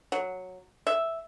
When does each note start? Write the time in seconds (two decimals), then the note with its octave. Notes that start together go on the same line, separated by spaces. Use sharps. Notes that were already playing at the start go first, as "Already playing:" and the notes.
0.12 F#3
0.87 E5